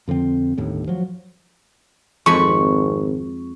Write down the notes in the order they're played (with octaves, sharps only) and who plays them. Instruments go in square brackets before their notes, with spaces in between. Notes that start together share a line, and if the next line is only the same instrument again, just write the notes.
[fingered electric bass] F2 D3 F3 C4
G1 D#2 A2
F3 F#3
[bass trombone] G#1 [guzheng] F2 G#3 B5 [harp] C#6